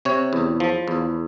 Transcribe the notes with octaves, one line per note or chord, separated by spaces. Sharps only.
C3 C#5
E2
F3
E2